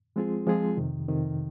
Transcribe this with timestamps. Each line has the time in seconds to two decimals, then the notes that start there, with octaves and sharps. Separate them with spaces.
0.16 F3 G#3 C4 F4 G#4
0.47 F3 G#3 C4 F4 G#4
0.77 F2 C3 D#3
1.08 F2 C3 D#3